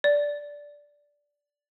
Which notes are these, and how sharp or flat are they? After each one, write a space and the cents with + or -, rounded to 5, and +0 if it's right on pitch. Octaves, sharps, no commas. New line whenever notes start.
D5 -10